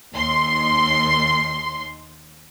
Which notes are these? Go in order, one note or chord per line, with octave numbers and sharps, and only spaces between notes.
D#2 C6